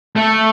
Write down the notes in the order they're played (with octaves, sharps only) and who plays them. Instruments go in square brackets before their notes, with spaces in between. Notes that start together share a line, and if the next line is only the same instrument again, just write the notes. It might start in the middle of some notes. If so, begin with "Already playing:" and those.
[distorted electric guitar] A3